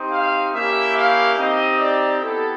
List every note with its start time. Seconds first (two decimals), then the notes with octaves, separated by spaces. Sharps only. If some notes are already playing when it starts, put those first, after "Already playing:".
Already playing: C4 D#4 G4
0.11 F5
0.54 A#3 C#4 E4 G4 E5
0.96 F5
1.38 C4 D#4 G4 D#5
1.80 D5
2.22 B3 E4 G4 A4